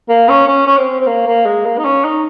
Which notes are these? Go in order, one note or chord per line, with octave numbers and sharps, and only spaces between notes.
A#3
C#4
C#4
C#4
C4
C4
A#3
A#3
G#3
A#3
D#4
C#4
D#4